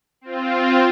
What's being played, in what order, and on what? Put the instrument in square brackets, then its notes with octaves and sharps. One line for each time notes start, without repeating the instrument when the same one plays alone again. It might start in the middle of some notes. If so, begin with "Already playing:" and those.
[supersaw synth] C4 F4